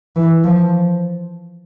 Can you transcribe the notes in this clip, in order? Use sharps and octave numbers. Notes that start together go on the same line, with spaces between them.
E3
F3